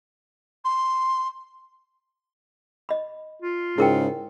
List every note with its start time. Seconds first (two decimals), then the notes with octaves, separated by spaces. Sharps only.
0.65 C6
2.89 D#5 B5
3.42 F4
3.78 G#2 C#3 E4 A#4 G5